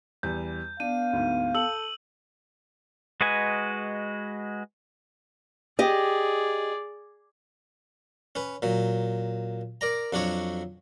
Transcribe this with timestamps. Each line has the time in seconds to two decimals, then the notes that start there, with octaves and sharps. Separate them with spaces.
0.23 E2 G3 G6
0.80 B3 D4 F5 D#7
1.13 D2 G#2
1.55 A4 E6 F#7
3.21 G#3 F#4 B4 D#5 G#5
5.79 G4 G#4 D5 D#5
8.35 C#4 B4
8.62 A#2 F#3
9.81 A#4 D5 A#5
10.13 F2 F#3 D4 F#4 C#5